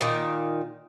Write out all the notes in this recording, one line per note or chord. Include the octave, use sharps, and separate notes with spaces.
A#2 D#3